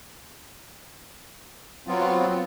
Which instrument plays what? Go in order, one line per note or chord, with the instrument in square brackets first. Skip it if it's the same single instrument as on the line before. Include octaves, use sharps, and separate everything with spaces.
[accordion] F#3 B3 C4 F4